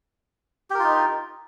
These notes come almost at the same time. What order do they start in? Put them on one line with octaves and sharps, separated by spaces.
G4 A#4 F4 D#4